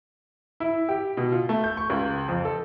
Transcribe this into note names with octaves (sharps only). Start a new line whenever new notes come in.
E4
G4
B2
F4
A3
G6
C#6
C#2
F2
A4